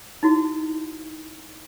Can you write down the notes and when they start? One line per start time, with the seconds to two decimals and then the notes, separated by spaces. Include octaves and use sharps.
0.23 D#4 E4 F#4